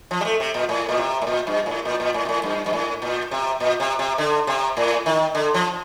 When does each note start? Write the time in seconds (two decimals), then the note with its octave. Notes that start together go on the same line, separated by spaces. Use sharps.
0.11 F3
0.21 G3
0.25 A3
0.40 C3
0.54 A#2
0.69 A2
0.89 A#2
0.98 C3
1.22 A2
1.27 A#2
1.47 G2
1.66 A2
1.85 A#2
2.00 A#2
2.14 A2
2.25 A#2
2.29 A2
2.43 G2
2.66 G2
2.73 A2
3.02 A#2
3.31 C3
3.60 A#2
3.80 C3
3.99 C3
4.18 D3
4.47 C3
4.77 A2
5.06 D#3
5.35 D3
5.54 F3